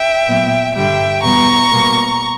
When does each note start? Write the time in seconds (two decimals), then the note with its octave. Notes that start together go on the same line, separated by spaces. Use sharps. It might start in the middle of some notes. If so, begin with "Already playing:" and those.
Already playing: E5 G5
0.28 A#2 F#3 B3
0.76 G2 D3 G3 E5 G5
1.23 E2 B2 G3 B3 A#5 C#6
1.72 B2 G3 A#3